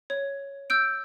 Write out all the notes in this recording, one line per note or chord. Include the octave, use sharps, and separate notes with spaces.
C#5
E6 G6 D7